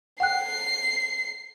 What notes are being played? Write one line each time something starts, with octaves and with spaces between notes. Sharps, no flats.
F#5 G5 F#6 C7